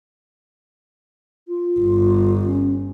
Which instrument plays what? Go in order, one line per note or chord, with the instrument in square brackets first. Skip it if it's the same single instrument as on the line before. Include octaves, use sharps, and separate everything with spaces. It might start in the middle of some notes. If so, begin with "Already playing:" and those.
[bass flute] F4
[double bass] G1
[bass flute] C#4